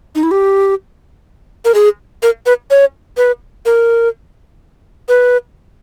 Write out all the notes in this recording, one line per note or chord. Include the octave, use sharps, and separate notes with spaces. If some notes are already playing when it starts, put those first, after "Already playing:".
D#4
E4
G4
A#4
G#4
A#4
B4
C#5
B4
A#4
B4